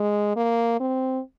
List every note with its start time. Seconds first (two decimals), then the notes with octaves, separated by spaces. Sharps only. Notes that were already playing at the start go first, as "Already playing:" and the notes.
Already playing: G#3
0.36 A#3
0.80 C4